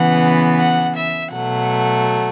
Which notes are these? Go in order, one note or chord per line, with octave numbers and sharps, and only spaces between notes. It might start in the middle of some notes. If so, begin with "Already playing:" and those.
Already playing: C#3 E3 B3 F#5
F#5
E5
B2 F#3 A3 F#5